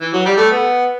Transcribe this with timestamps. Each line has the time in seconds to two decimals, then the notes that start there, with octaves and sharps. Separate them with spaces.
0.00 E3
0.13 F#3
0.25 G3
0.37 A3
0.50 B3